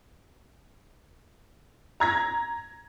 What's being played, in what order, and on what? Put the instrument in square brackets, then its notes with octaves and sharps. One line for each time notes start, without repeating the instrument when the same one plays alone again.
[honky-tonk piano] A#5 G#6 A#6